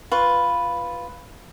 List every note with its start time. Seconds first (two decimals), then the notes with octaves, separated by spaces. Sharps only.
0.12 F4 B4 C#6